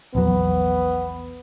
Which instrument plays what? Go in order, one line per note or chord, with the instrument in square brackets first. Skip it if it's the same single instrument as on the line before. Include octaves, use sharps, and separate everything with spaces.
[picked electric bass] A#1 E2 F#3 [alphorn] B3